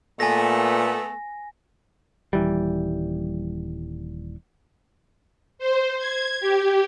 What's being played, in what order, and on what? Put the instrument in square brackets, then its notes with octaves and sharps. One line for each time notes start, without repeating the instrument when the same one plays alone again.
[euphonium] A#2 [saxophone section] A3 B3 [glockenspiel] G#5 A#6
[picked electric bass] D#1 E3 G3
[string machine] C5
G#6
G4